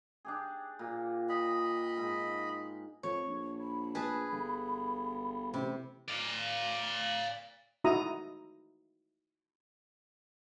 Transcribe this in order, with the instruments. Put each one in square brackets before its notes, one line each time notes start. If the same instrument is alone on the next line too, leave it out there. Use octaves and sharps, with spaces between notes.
[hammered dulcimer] D4 G4 G#4
A#2
[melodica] D#5 B5
[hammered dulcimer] G#2
[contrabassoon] F2 [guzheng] C#5
[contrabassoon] A#1
[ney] B5
[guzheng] G#4 B4 A5
[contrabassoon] G1
[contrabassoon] A1 [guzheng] C3
[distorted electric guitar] D5 F5
[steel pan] D#4 E4 F#4 E5 A#5 D#6